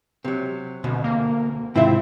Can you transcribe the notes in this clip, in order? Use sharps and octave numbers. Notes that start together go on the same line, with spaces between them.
C3 F#3
D2 B2
A#3
G#2 C3 D#3 C4 E4 F4 E5